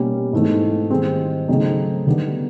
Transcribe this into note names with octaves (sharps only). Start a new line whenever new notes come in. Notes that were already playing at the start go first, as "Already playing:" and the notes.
Already playing: B2 G3 A#3 C#4
G#2 E3 A3 C4
D#3 G3 C4 E4 G#4
C#3 F#3 A3 C4 D#4
D3 G3 B3 D#4 G4